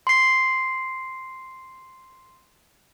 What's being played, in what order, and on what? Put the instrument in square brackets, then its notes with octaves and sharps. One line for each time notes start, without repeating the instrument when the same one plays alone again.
[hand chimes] C6 C7